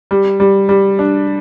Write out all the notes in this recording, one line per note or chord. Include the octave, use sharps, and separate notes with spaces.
G3
G3
G3
D4